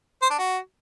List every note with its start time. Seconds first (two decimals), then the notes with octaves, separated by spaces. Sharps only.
0.22 C5
0.30 D4
0.38 F#4